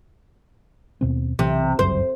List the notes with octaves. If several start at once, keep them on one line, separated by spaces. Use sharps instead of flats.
D#2 B2 C4
B1 C3 E3
G1 C#2 F#2 C5